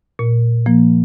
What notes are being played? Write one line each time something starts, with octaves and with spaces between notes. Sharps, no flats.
A#2
F3 A#3